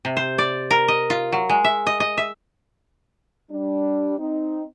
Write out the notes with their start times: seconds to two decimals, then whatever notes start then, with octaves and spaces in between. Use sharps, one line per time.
0.05 C3
0.17 C5
0.38 D5
0.71 A#4
0.88 D#5
1.10 F4
1.32 F#3
1.49 G#3
1.64 E5
1.87 D#5
2.00 D#5
2.17 E5
3.51 G3 D4
4.18 C4 D#4